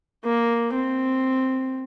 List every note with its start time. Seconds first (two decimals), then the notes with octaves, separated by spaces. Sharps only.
0.24 A#3
0.74 C4